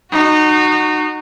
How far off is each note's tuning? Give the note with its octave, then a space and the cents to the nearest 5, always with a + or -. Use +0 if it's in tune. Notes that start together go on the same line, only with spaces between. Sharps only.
D#4 -25 F#4 +0